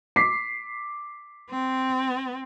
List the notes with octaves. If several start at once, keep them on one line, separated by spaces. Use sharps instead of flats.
D6 B6 C7
C4